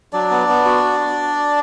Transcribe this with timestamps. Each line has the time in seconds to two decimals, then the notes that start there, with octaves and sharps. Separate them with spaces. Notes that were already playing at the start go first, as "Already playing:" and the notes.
0.13 F#3 D4 D5
0.31 B3
0.49 B3
0.65 F#4